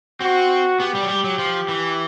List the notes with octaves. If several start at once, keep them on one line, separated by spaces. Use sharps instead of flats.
C4 F#4
B3 G4
G3
F#3
G3
F#3
F3
E3